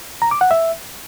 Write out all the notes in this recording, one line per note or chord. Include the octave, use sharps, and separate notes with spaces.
A#5
D6
F#5
E5